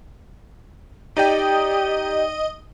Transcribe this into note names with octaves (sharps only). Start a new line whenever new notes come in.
D#4 G4 D5 D#5 G5